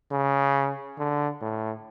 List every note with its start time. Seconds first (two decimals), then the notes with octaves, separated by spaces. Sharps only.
0.11 C#3
0.98 D3
1.42 A2